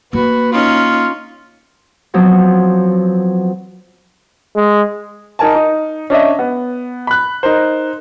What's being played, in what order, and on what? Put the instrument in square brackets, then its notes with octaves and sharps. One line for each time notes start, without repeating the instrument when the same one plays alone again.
[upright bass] A#3 [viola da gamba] F#4 [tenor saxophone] B4
[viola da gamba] C#4 D#4 [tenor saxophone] F4
[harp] F3 F#3 B3 C4
[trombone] G#3
[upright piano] D#4 A#4 G#5 A5
D#4
C#4 D4 D#5 E5
B3
B5 F#6
D#4 A#4 C5